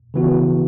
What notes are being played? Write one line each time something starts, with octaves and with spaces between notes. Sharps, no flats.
C#3 E3 B3 F#4